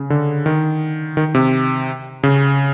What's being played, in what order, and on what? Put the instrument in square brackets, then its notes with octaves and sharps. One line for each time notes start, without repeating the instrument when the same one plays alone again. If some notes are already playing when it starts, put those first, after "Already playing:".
Already playing: [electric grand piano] C#3
D3
D#3
D#3
C3
C#3